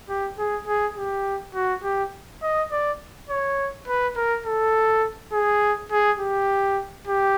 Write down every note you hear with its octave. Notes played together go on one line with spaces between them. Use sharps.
G4
G#4
G#4
G4
F#4
G4
D#5
D5
C#5
B4
A#4
A4
G#4
G#4
G4
G4